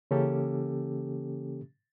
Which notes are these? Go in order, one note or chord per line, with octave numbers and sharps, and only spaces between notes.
C#3 E3 A#3 C#4 G4 A4